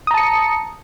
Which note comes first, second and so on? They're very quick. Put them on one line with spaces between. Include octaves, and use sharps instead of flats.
D#6 A#5 A5 C#7